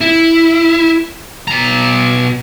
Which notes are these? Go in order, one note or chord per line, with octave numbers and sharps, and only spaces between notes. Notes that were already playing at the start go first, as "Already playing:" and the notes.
E4
B2 A#5